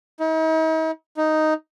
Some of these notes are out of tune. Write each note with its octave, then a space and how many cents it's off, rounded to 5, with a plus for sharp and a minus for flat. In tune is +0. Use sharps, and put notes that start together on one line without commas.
D#4 +45
D#4 +0